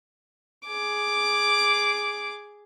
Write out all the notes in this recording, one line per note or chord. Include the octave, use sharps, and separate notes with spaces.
G#4 D6